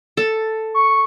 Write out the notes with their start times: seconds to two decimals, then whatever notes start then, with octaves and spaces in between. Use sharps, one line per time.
0.17 A4
0.74 C#6